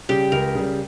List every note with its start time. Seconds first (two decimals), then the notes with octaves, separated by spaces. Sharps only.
0.09 C#3 G3 G4
0.32 C#2 A#4
0.55 C#3 G3